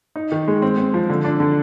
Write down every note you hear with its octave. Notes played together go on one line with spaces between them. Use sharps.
D#4
D#3
G#3
C4
C4
F3
D3
D4
D3